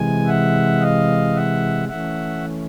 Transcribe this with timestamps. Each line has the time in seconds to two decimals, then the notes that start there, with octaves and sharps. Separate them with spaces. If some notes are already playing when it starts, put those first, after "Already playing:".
Already playing: C3 E3 G#3 G#5
0.26 E5 F#5
0.81 D#5 F5
1.35 E5 F#5
1.89 E3 A3 C#4 E5 F#5